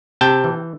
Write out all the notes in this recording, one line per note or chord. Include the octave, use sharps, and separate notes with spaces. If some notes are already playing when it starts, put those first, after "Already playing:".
C3 G5 A5
E3